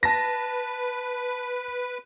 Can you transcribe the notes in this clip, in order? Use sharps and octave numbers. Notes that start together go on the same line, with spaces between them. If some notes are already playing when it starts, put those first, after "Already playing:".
B4 A5 A#6 B6